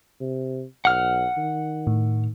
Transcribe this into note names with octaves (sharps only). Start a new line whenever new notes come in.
C3
B1 F#5 F6
D#3
A2